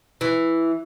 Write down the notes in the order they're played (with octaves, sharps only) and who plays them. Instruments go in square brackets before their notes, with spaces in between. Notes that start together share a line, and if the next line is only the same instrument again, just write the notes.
[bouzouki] E3